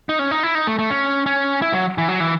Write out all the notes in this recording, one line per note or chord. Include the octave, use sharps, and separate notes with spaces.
D#4
C#4
D#4
E4
D#4
A3
A3
C#4
C#4
E4
F#3
E3
F#3
E3